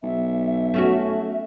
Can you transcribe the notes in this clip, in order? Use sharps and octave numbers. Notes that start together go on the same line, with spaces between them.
B1 E5
A3 C#4 F#4